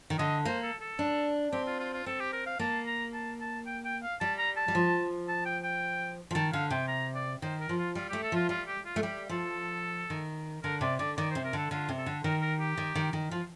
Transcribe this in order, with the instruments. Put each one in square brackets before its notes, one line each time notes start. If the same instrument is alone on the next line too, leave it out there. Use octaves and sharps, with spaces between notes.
[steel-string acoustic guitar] D#3
[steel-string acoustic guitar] D3 [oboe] D#5
[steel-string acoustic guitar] A#3 [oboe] C5
[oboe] A4
A4
[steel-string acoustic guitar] D4
[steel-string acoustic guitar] C4 [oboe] G4
[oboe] F4
F4
F4
[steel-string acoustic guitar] C4 [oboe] A4
[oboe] G4
A#4
F5
[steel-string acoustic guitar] A#3 [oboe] A5
[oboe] A#5
A5
A5
G5
G5
F5
[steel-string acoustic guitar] G3 [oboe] A5
[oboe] A#5
A5
[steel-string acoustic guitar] G3
F3
[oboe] A5
G5
G5
[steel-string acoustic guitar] F3
[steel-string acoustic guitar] D#3 [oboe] A5
[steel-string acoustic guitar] D3 [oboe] F5
[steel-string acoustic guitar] C3 [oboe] G5
[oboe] A#5
D5
[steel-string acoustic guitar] D#3 [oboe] C5
[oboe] A#4
[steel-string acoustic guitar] F3
[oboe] F4
[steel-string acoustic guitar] G3 [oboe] F4
[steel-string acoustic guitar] A3 [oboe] G4
[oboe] A4
[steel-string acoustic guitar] F3 [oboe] F4
[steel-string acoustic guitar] G3 [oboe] F4
[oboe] G4
F4
[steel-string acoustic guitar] A3
[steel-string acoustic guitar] G3 [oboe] G4
[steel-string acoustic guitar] F3 [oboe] A4
[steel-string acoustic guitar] D#3
[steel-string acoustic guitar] D3 [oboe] A#4
[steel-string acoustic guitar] C3 [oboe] D5
[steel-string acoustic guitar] D3 [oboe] D5
[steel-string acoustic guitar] D#3 [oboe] D5
[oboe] C5
[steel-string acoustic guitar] C3
[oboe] A#4
[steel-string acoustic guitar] D3 [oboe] A4
[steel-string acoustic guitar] D3 [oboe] F4
[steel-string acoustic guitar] C3
[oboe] A4
[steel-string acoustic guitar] D3
[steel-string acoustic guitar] D#3 [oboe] A#4
[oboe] A#4
G4
[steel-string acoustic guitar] D#3
D#3
D#3
[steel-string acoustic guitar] F3 [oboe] F4